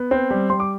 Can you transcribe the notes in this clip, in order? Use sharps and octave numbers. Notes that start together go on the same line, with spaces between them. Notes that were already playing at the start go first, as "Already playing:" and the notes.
Already playing: B3
C4
G3
G3 C6
D6